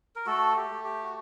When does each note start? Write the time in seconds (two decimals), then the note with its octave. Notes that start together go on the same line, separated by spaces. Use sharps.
0.16 A#4
0.26 A3 F#4 A4
0.56 G4
0.70 A3
0.84 G4
1.03 F#4